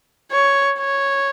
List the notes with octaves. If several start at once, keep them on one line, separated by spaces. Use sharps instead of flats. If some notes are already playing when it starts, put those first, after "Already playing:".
C#5
C#5